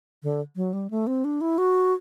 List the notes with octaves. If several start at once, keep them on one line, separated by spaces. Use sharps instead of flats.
D3
F#3
G3
A3
C4
D4
E4
F#4